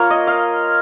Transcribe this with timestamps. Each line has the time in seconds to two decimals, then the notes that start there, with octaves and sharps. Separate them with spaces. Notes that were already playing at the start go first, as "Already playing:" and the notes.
Already playing: A#3 F4 A#4 C#5 F5
0.10 D#5
0.27 F5